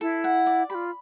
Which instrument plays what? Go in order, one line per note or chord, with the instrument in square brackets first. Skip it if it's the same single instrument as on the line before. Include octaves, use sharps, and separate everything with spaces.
[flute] E4 [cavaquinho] A4
[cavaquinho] F#5
D5
[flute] G4 [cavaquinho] B5
[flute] F4